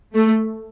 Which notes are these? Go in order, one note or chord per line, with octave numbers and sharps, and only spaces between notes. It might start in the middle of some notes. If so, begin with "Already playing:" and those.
A3